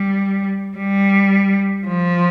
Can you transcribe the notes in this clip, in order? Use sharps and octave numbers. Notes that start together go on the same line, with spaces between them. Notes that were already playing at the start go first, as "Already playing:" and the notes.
Already playing: G3
G3
F3